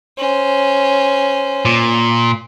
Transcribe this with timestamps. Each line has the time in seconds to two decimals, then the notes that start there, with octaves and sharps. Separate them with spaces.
0.17 C#4 C5
1.65 A#2